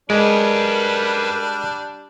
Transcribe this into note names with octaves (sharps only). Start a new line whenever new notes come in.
G3 G#3 D4 A#4 B4 D5